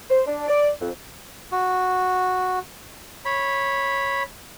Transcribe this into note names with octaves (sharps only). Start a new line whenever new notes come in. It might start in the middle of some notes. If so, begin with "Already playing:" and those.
C5
D4
D5
F2
F#4
C#5 B5